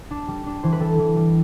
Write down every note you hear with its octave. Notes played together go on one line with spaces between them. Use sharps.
D4
G3
D4
E3 C5
B4
G3 A4
E3
G3